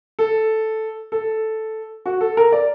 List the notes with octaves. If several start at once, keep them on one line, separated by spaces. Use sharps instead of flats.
A4
A4
F#4
A4
A#4
D5